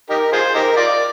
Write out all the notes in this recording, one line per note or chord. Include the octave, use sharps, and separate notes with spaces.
D#4 G4 A#4
F4 G#4 C5
D#4 G4 A#4
F4 A#4 D5